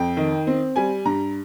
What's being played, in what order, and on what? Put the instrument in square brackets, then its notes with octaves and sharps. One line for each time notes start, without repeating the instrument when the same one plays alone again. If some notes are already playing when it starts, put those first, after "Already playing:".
Already playing: [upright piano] F2 G5
D#3
C4
G3 G#5
G2 A#5